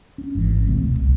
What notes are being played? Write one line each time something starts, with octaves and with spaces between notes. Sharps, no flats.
C#4
G#1 G#2 C3 E3
D2 B2 A3 C4
D1 B2
C2